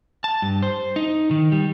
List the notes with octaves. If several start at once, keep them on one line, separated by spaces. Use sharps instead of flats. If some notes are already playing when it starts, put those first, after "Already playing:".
A5
G2
C5
D#4
D#3
G3